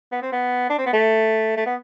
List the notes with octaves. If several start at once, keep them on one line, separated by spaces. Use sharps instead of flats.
B3
C4
B3
D4
C4
B3
A3
A3
B3